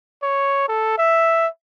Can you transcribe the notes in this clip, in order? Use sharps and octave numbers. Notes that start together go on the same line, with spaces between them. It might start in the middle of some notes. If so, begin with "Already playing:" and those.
C#5
A4
E5